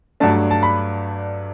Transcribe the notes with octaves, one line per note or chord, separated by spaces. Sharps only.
G2 F#3 A3 D4 A5
A5
B5